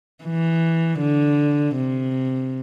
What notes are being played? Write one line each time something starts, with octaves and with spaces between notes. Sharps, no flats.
E3
D3
C3